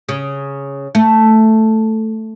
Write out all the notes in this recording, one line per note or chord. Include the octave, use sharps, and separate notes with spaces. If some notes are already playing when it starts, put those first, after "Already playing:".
C#3
A3